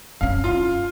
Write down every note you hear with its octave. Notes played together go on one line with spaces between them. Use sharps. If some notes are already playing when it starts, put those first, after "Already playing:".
F#2 C#4 F5
F4 F5